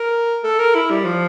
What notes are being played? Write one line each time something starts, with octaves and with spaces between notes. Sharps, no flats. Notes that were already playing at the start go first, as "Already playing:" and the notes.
Already playing: A#4
A4
A#4
E4
G3
F3